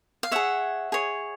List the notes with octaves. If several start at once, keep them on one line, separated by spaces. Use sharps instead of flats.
F5
G#4 C#5 E5 F#5
G#4 C#5